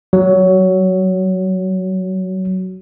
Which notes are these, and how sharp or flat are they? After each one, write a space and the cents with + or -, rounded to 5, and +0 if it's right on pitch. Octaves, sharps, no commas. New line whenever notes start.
F#3 +15